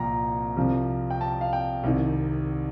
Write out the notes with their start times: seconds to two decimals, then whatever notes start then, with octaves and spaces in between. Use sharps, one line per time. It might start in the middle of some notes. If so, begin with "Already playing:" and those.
Already playing: C2 A#2 F3 G5 A#5
0.57 C2 C3 F3
1.10 G5
1.21 A5
1.41 F5
1.53 G5
1.84 C2 C3 D#3